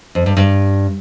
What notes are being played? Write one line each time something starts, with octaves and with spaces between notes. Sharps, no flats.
F2
G2
G2